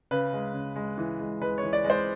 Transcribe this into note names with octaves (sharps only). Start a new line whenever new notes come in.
C#3 B4
G#3
C#3
G#3
E3
G#3
G#3 B4
C#5
E3
D5
G#3
C5